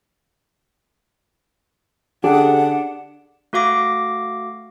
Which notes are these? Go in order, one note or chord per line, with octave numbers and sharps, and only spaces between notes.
D3 D4 G4 G#4 F#5
A3 F#4 F5 D6 A#6